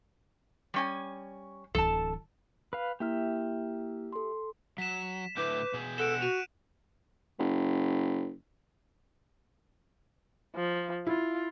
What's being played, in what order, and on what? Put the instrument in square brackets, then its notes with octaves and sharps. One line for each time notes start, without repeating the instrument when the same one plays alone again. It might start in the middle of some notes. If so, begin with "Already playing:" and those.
[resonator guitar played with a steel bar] G3 C#4 G#5
[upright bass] D1 E3 [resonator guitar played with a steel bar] A4 A5
[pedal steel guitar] B4 F5
[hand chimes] A#3 E4 F6 [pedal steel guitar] G4 E5
[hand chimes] A4 C6
[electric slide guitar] F#3 [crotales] B6 E7
[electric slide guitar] A2 D3 E4 [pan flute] B4 [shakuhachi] D6 [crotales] G6
[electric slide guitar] B2 G#4
[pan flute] A4 [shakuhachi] F#5 [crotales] D7 E7
[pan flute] F#4 [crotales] D#7 F7
[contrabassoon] F#1
[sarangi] F3
[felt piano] E4 [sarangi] F4